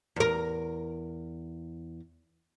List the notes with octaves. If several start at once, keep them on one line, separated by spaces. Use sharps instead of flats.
E2 A#4